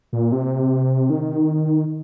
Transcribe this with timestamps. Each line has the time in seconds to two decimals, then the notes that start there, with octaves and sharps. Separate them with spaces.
0.13 A#2
0.32 C3
1.10 D#3